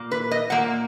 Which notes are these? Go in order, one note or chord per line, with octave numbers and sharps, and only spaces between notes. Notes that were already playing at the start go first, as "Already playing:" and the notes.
Already playing: A#2 A#3
B4
D#5
A#2 A#3 F#5